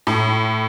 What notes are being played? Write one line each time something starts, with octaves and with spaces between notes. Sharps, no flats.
A2